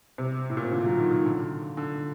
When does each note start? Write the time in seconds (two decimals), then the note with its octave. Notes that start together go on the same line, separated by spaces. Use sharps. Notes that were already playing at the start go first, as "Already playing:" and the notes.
0.18 C3
0.50 A2
0.57 A#2
0.64 C3
0.72 D3
0.85 F#3
0.98 D#3
1.11 D#3
1.25 D3
1.77 D3